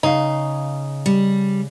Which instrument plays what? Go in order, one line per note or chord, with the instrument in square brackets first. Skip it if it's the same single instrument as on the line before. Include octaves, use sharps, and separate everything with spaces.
[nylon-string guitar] C#3 F5 [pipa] D#4
[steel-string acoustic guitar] G3